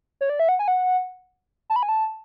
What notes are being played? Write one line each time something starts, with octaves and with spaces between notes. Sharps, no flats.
C#5
D5
E5
F#5
G#5
F#5
A5
B5
G#5
A5